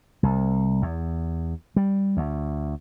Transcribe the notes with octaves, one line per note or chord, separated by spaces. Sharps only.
C2
E2
G3
D2